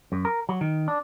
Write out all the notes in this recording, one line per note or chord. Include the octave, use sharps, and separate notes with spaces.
F#2
A#4
F#3
D#3
D4